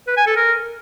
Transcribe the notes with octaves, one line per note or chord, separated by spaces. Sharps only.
B4
G#5
A4
A#4